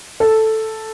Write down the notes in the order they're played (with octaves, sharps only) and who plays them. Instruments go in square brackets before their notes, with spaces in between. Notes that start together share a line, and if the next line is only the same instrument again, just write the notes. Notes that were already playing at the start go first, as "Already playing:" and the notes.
[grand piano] A4